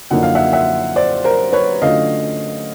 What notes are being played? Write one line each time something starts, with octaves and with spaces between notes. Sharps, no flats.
F#2 D3 F3 A#3 D#4 F#5
F5
E5 F#5
E5 F#5
C5 D5
A#4 C5
B4 C#5
D3 F#3 A3 C#4 F4 D#5 F5